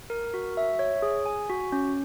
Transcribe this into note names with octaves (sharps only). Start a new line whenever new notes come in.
A#4
F#4
E5
C#5
G#4
G#5
F#4
C#4